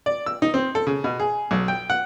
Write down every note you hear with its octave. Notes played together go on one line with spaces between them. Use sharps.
D5
E6
D#4
C4
A4
C#3
B2
G#4
B1
G5
F#5